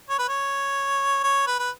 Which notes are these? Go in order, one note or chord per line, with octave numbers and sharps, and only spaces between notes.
C#5
B4
C#5
C#5
B4
B4